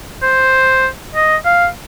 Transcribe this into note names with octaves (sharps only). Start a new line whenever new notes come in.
C5
D#5
F5